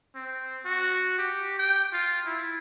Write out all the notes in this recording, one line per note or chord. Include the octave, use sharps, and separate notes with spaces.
C4
F#4
G4
G5
F4
E4